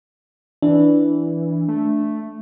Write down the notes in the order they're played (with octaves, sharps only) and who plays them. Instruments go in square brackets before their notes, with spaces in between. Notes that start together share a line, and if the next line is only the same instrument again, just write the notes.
[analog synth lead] E3 [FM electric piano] D4
[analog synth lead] A3